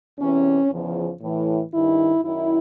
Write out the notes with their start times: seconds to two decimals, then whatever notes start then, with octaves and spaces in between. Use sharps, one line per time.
0.19 E2 C3 E3 C#4
0.70 E2 C#3 F3
1.21 A2 E3
1.72 G2 D#3 E4
2.23 F#2 D#3 E4